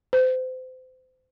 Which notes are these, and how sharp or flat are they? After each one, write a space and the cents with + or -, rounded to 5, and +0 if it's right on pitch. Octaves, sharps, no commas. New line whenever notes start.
C5 -30